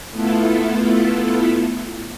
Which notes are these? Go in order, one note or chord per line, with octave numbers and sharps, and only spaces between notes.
A3 B3 E4 F4 A4